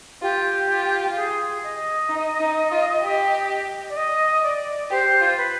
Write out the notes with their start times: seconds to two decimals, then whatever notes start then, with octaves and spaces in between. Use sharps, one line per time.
0.22 F4 G4
0.68 F4
1.16 G#4
1.63 D#5
2.09 D#4
2.40 D#4
2.71 F4
3.03 G4
3.89 D5
3.97 D#5
4.43 D5
4.90 G4 C5
5.21 F4
5.37 B4